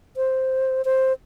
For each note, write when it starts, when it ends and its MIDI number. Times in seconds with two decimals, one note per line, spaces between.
0.17 0.85 72
0.85 1.13 72